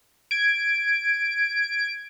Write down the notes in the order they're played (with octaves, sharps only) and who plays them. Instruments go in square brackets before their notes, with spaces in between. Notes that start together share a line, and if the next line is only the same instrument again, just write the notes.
[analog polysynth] G#6 D7